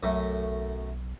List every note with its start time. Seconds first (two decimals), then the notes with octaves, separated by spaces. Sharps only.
0.03 B1 F#2 A3